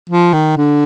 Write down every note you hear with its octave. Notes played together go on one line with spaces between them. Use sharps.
F3
D#3
D3